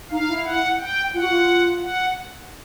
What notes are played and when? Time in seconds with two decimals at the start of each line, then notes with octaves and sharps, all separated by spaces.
0.10 D#4 F5
0.27 E4
0.45 F#5
0.79 G5
1.13 F4 F#5
1.21 F#4
1.28 F4
1.82 F#5